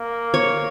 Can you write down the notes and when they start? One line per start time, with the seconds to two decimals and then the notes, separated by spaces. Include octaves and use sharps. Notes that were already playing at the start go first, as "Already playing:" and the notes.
Already playing: A#3
0.34 C#5